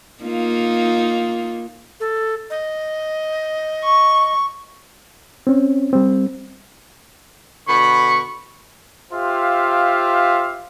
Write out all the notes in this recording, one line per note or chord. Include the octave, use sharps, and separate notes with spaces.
A#3 D#4 F4
A4
D#5
C#6
C4 C#4
G3 C4
B2 D3 B5 C#6
F4 G4 C5 E5 F5